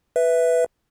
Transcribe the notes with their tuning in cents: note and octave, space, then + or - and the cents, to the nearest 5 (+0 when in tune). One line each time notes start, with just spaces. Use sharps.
B4 +0 E5 +0